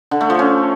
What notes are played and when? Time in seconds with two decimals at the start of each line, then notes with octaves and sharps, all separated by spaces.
0.11 D3
0.21 A3
0.30 F3
0.39 C#4